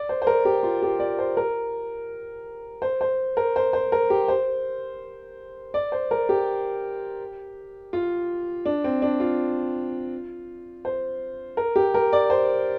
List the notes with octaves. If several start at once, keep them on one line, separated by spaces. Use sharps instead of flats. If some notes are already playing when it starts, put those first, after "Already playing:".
Already playing: D5
C5
C5
A#4
G4
F4
G4
D5
C5
A#4
C5
C5
A#4
C5
C5
A#4
G4
C5
D5
C5
A#4
G4
F4
D4
C4
D4
F4
C5
A#4
G4
A#4
D5
C5